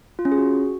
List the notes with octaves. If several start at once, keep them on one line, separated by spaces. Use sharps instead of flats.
F4
C#4
G#4
F#4